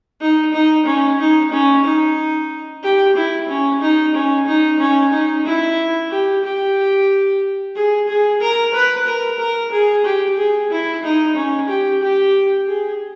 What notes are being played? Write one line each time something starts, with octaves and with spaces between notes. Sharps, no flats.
D#4
D#4
C#4
D#4
C#4
D#4
G4
E4
C#4
D#4
C#4
D#4
C#4
D#4
E4
G4
G4
G#4
G#4
A#4
B4
A#4
A#4
G#4
G4
G#4
E4
D#4
C#4
G4
G4
G#4